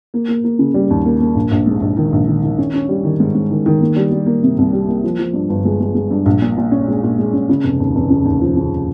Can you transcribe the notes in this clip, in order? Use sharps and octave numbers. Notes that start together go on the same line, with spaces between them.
A#3
A#3
A#3
C#3
G3
D#2
A#3
A#3
A#1
A#1
G#2
A#1
D#3
A#1
D#3
D#3
C#4
C#4
G3
D#3
G#2
G#2
D#3
D#3
A#3
G3
G3
A#3
C3
C2
G3
A#3
F3
F3
G2
G1
G#3
G#3
G#3
G2
A#1
A#2
A#2
C#4
G#3
A#2
G#3
C#4
C#3
F1
D#2
F1
C#3
D#2
F3
C#3